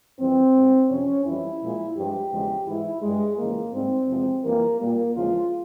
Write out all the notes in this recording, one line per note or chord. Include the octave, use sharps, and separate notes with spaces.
F2 E3 G3 C4
G#2 G3
F2 C3 F3 C#4
F2 E3 G3 E4
A#2 F3 G#3
G2 F3 G#3 G4
E2 C#3 F3 G#3
G#2 E3 G#3 E4
G2 G3 G#3
F2 C#3 E3 G#3 A#3
G#2 G3 C4
E2 C3 F3 G#3
F2 E3 G3 A#3
A#2 G3 A#3
E2 C#3 F3 G#3 F4